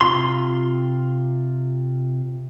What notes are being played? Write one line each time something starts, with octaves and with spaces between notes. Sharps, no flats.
C3 F4 C6